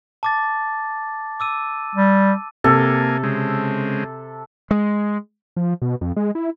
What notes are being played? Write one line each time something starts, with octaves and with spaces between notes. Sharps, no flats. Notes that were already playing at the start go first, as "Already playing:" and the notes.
A5 D6 A6
D6 E6 D#7
G3
C3 A#3 A4 G#5
C#3 G#3 C4
G#3
F3
B2
F2
G#3
E4